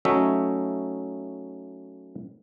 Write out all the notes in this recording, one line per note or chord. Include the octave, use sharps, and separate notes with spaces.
F#3 A3 C#4 D#4 E5